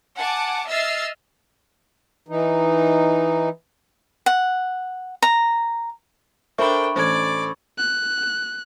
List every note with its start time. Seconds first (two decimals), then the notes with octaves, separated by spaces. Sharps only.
0.17 F#5 G#5 A5 D6
0.68 D#5 E5 E6 F6 A6 C7
2.28 E3 D#4
4.26 F#5
5.22 A#5
6.58 D4 A4 A#4 C5 E5 G5 B5 C#6
6.96 A1 A4 C5 D5 G#6
7.78 F#6